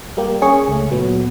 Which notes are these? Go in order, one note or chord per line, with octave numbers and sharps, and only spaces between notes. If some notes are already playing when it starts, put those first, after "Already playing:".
G3 A#3 G4
C#4 G#4 C#6
C#2 A3
A#2 F#3 B3